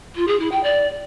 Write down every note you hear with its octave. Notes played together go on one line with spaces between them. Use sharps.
F4
G#4
E4
G5
D5